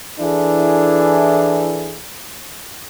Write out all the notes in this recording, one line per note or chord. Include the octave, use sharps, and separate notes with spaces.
E3 D4 E4 G#4 A4